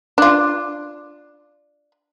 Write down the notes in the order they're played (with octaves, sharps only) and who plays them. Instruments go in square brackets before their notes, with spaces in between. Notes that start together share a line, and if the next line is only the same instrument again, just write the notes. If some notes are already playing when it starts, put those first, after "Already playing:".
[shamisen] D4 F4